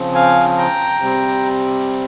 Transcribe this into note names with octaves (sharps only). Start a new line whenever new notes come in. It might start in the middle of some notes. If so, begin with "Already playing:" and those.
Already playing: C#3 F3 C4
F5 G#5
G5 A#5
C3 G3 C4